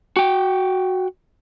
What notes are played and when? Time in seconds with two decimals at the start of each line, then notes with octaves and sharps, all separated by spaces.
0.16 F#4 G5